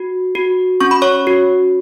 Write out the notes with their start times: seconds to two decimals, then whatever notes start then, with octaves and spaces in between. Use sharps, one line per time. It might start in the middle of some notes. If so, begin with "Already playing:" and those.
Already playing: F#4
0.35 F#4
0.80 C#4 C#6
0.91 B5
1.02 C#5 C#6
1.27 F#4